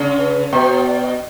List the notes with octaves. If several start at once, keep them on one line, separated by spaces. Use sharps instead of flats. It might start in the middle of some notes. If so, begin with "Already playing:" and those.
Already playing: C#3
B4
B2 C5
C#5
D5
D#5